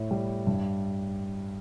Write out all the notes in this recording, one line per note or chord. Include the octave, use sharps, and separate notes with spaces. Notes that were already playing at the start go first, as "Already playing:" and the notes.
Already playing: A2
G3
G2